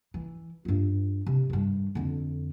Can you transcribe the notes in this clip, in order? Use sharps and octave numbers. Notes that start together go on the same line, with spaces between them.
E3
G2 F4
C3
G2 D#3
F2 D3